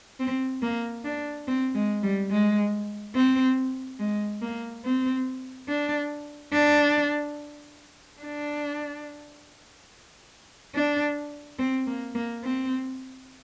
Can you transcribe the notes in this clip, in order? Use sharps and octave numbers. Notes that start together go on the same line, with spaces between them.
C4
A#3
D4
C4
G#3
G3
G#3
C4
G#3
A#3
C4
D4
D4
D4
D4
C4
A#3
A#3
C4